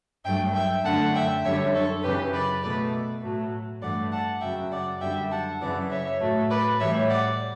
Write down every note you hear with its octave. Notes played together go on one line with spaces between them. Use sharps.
G2 F#3 A3 E5 G5
E5 G5
F#2 D3 A3 F#5 A5
E5 G5
F#2 D3 G3 C#5 E5
A4 C#5
F#2 C#3 E3 G4 B4
B4 D5
B2 A3 B4 D5
A2 F#3 A3
G2 E3 A3 D5 F#5
F#5 A5
F#2 C#3 F#3 E5 G5
D5 F#5
F#2 D3 G3 E5 G5
F#5 A5
F#2 C#3 E3 D5 F#5
C#5 E5
A2 F#3 A3
B4 D5
A2 E3 G3 C#5 E5
D5 F#5